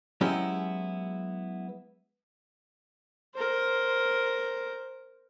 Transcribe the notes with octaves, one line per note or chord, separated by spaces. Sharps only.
F#3 G#3 B3 C#4 E4 G4
A#4 C5